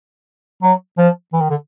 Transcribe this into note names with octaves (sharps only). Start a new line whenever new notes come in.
F#3
F3
E3
D#3
D3